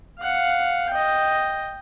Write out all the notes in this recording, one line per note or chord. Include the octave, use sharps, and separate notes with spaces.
F5 F#5
D#5 G5